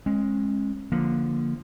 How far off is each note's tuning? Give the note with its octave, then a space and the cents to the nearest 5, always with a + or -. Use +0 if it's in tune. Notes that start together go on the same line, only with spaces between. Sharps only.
G#3 +0 C#4 -35
D3 +0 F3 +0 A#3 +0